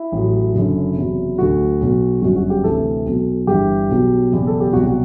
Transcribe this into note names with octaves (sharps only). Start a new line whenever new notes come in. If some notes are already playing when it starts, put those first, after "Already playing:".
Already playing: E4
A1 A2 F#3
F#1 F#2 D3
F#1 E2 C3 F#3
D2 D3 F#3 F#4
B1 B2 F#3
G1 F#2 F#3 F#4
F#4
G4
D2 C3 E3 A4
B1 B2 F#3
G1 G2 E3 G4
B1 B2 F#3
F#1 E2 B2
A4
G4
C2 B2 F#3 F#4
F#4